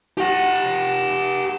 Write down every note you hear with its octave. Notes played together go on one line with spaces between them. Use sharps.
G4 F#5